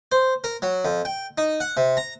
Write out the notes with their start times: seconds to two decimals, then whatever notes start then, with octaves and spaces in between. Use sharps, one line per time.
0.12 C5
0.44 A#4
0.62 F#3
0.85 F2
1.05 G5
1.38 D#4
1.60 F#5
1.77 C3
1.97 A#5